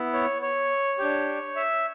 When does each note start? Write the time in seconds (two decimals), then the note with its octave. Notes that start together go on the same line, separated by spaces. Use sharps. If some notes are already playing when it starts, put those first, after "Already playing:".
Already playing: B3 E4
0.13 C#5
0.42 C#5
0.99 D4 G4
1.56 E5